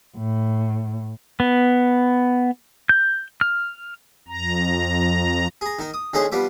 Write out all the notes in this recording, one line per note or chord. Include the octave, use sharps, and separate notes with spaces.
A2
B3
G6
F6
F2 A#5
G#4 A#5
D#3 D#4
D#6
D2 G#3 C#4 D#4 G#4 C5
F3 G3 B3 D6